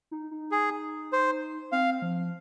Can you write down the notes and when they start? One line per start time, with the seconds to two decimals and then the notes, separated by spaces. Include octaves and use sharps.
0.11 D#4
0.31 D#4
0.51 G#4
1.13 C5
1.72 C4 F5
2.02 F3